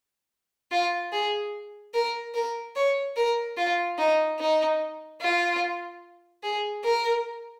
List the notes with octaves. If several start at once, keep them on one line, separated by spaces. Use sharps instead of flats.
F4
G#4
A#4
A#4
C#5
A#4
F4
D#4
D#4
F4
G#4
A#4